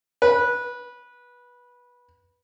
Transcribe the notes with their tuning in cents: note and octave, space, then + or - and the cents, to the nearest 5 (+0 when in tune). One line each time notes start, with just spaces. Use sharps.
B4 -15